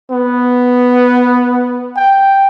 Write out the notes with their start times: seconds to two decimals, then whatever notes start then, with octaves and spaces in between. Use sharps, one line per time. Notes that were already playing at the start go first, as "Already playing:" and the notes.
0.11 B3
1.96 G5